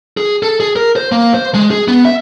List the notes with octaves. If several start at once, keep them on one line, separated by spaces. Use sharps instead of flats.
G#4
A4
G#4
A#4
C5
A#3
C5
G#3
G#4
B3
E5